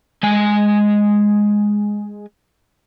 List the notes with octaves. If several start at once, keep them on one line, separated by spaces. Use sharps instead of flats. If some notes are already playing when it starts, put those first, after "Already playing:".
G#3 G#5